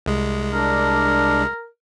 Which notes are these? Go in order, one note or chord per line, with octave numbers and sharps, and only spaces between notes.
C2 G#3
D4 A#4